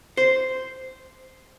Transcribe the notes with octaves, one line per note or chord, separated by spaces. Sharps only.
C5